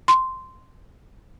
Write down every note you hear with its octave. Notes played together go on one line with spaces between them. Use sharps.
C6